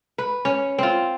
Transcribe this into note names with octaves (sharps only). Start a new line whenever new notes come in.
B4
C#4
C4 F4